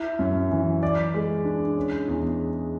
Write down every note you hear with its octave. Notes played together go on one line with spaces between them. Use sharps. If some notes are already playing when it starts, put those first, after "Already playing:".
Already playing: E4
F#2
E3
D5
G#3
D4
C#4
E2